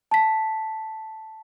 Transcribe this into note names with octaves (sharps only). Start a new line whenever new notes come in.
A5 B6